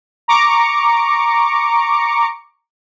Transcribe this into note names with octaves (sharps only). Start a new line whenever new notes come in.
A#5 C#6 D6 C#7